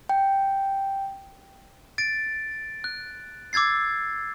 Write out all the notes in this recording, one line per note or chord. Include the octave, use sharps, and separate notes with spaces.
G5
A6 D7
F#6
D6 E6 G#6 A6 C7